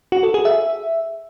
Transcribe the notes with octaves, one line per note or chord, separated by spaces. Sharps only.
F#4
A4
G#4
E5